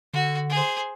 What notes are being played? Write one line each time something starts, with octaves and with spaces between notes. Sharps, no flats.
D3 F#4
G#4 C5